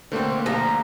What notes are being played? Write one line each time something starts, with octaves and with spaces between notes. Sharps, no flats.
D3 A3 A#3 C4 C5
F3 F5 A#5